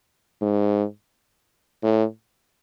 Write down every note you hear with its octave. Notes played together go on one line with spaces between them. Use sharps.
G#2
A2